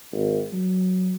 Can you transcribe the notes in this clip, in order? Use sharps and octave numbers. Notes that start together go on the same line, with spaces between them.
G#1
F#3